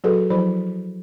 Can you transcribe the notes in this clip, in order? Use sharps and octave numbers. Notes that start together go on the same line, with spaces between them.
F#3 F#4 G#4 A4 B4
F3 F#3 E4 C5 B5